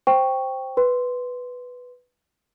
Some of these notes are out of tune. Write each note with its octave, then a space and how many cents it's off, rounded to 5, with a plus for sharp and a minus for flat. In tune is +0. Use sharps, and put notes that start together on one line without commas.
C5 +0 G5 +0 C#6 +0
B4 +0 C6 -5